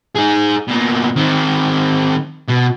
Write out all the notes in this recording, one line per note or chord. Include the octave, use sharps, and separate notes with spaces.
D#4 G#4
B2 A#3
D#3 C4
B2